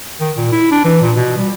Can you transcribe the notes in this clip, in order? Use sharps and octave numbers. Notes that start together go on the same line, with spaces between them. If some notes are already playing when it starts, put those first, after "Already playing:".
D#3
A#2
E4
D4
E3
A#2
B2
G3